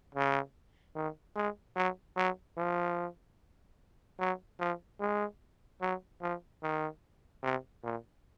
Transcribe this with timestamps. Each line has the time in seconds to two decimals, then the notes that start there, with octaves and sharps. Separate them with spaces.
0.15 C#3
0.95 D#3
1.36 G#3
1.76 F#3
2.17 F#3
2.58 F3
4.19 F#3
4.60 F3
5.00 G#3
5.81 F#3
6.21 F3
6.63 D#3
7.43 C3
7.83 A#2